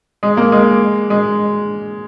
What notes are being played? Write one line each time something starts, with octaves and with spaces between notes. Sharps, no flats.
G#3
A#3
G#3
G#3